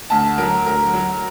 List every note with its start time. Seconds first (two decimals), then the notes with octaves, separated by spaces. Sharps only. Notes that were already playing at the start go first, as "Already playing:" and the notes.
0.10 D2 A5
0.38 F#3 A#4
0.66 D2 A#4
0.94 F#3